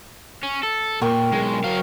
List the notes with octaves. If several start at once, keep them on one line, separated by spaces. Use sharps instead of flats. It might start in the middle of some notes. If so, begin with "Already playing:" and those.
C#4
A4
A#2 A#4 G5 C#6
B1 G#3 A#4
F#3 F5